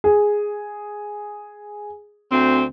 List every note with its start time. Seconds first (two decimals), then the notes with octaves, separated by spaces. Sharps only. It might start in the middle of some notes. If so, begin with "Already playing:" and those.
0.04 G#4
2.32 D2 C4